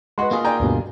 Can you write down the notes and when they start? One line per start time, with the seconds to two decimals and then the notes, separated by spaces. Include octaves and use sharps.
0.18 G#3 F#4 B4 D#5 C6
0.31 A#3 F4 G#4
0.45 D5 G5 G#5 A#5
0.60 D2 G2 B2